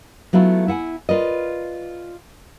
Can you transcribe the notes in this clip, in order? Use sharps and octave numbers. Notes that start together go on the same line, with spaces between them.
F#3 A3 B3 E4 F4
E4 F#5 G#5
F4 A#4 B4 D5 D#5